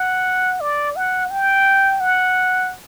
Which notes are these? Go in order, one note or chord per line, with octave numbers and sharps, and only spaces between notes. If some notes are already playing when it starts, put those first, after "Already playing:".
Already playing: F#5
D5
F#5
G5
F#5